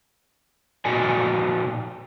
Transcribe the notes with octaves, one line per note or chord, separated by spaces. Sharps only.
A#2 D#4 F#4 A4 D5 G#5